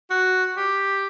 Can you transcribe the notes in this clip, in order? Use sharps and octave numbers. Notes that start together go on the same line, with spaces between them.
F#4
G4